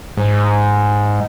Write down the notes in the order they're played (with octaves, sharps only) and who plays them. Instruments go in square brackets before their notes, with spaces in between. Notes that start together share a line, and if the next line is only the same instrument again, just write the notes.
[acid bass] G#2